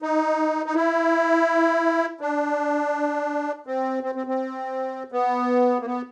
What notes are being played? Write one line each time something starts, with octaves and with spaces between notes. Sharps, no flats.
D#4
D#4
E4
D4
C4
C4
C4
C4
B3
A#3
B3